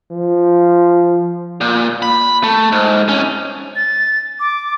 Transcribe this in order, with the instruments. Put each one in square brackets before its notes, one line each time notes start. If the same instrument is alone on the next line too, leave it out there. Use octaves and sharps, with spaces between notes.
[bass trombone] F3
[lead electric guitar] A#2
B5
A3
G#2
C2 C#4
[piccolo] A6
D6